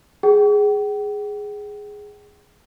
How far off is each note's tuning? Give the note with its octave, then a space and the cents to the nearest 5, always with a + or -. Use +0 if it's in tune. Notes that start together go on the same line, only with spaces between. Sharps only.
G#4 +0 G5 -45